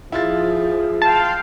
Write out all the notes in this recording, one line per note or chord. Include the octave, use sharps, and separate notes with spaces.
F3 E4 F4 G#4 A6
F5 G5 A5 C6